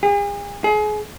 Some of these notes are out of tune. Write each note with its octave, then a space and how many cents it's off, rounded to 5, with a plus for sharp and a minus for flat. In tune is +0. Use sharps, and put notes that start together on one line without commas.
G#4 -40
G#4 +30